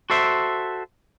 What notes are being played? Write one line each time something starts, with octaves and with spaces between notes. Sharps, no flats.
F#4 A4 C5 E5